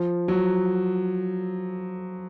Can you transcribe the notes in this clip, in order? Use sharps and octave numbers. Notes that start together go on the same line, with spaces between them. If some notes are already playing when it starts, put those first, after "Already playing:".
Already playing: F3
F#3